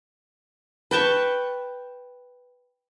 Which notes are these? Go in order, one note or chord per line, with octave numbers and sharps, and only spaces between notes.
B4 G5 A5 C#6